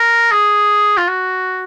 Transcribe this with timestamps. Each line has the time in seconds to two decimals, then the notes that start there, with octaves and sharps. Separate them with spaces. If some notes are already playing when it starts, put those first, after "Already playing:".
Already playing: A#4
0.32 G#4
0.97 F4
1.08 F#4